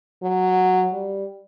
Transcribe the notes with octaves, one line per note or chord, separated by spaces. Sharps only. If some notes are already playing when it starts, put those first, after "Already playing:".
F#3
G3